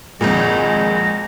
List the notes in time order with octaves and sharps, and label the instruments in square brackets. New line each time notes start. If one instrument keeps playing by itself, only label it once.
[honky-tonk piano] G#1 F2 A#2 [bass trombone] G#3 [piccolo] A#6